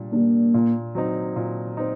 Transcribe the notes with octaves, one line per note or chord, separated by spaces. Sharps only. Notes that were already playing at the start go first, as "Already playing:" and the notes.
Already playing: A#2 G3 D4
G3 A#3 D4
A#2
F#3 C4 D#4
A#2
C4 D#4